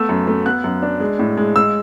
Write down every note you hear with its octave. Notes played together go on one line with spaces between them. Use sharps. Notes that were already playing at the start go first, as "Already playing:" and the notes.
Already playing: A3 B3 E6
F#2
A3
B3 F#6
F#2
D4
G#3
A2
G#3
G#3 E6